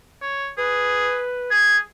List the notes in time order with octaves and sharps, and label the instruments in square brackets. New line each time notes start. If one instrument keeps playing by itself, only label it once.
[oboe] C#5
[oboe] G#4 [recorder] B4
[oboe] G#4 [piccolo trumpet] G#6